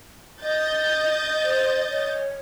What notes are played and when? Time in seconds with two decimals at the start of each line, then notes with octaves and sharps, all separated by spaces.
0.41 D#5 G6 A6
1.43 C5
1.90 C#5